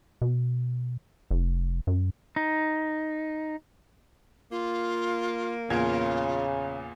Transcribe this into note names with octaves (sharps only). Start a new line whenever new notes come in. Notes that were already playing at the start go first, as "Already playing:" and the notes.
B2
F1
F#2
D#4
A#3 F4
E2 A#2 C#3 F4 G#6